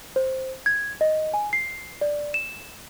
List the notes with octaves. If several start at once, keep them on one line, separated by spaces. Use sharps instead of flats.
C5
G#6
D#5
G#5
C7
D5
E7